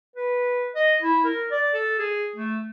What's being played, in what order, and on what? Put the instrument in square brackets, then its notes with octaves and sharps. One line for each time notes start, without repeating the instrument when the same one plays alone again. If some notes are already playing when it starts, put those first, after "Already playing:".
[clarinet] B4
D#5
E4
A#4
D5
A4
G#4
A3